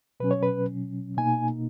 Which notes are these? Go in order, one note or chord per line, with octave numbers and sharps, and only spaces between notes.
B2 F#3 C#4 B4
C#5
B4
B2 A#3 D#4 G#5